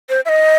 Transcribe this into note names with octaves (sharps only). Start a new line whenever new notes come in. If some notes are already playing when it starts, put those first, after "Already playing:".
C5
E5
D#5